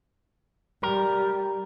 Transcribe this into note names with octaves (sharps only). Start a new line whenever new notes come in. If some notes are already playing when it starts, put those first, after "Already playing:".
G3 A#4